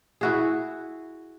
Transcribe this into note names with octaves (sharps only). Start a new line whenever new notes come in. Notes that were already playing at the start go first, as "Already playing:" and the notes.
E4 F#4 G#4